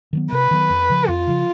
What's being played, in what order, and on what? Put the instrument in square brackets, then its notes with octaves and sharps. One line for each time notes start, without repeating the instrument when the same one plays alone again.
[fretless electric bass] D#3 F#3 B3
[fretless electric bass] C3 [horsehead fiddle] B4
[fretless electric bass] D#3 F#3 B3
F2
C#3 F3
[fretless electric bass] F2 [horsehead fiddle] F4
[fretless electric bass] C#3 F3